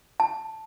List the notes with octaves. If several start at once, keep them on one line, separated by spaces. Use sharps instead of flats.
A5